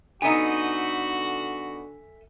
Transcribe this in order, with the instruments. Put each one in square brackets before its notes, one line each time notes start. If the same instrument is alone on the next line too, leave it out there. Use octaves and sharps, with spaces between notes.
[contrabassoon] D3 [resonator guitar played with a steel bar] B3 D#4 [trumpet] F#4 [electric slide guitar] A4 E5 G#5